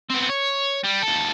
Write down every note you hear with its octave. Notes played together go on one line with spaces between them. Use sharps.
B3 C4
C#5
G3
D#2 A4